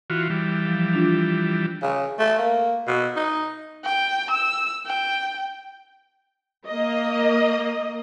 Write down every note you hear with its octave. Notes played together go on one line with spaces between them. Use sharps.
E3 F4 F#4
E3 G3
F3
D4 F4
C#3
A3
A#3
B2
D#4
G5
E6
G5
A#3 D#5